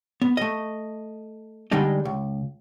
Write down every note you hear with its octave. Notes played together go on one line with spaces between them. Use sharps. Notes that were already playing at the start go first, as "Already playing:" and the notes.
B3
A3 D#5
D3 G3 G#3 D4 D#4
C#2